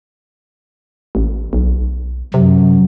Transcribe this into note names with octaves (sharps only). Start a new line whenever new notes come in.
A1
B1
F#2 C3